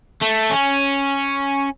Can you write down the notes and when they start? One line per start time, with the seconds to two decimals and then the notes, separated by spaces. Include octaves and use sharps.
0.21 A3
0.50 C#4